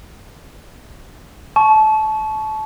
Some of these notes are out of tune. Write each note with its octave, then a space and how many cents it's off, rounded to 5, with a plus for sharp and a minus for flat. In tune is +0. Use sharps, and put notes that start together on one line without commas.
A5 -25 C#6 +0